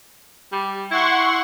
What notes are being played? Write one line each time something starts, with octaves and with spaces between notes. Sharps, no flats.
G3
E4 F#5 C6 C#6